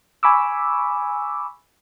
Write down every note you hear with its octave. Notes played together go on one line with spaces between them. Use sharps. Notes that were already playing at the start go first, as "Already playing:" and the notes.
G#5 B5 C#6 D6 E6